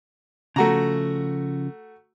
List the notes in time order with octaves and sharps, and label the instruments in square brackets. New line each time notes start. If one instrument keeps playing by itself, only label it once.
[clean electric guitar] C#3 F3 [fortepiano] A3 F#4 A#5